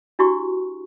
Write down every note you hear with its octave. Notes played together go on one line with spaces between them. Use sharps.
D4 E4 F#4 G4 C#6